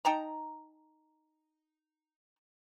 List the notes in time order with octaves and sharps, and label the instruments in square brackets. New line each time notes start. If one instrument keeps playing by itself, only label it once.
[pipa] D#4 G5 A5 A#5